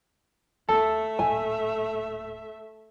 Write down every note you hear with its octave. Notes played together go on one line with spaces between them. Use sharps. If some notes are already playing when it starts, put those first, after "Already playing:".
D#2 A3 A4 E5
D1 A#2 G#5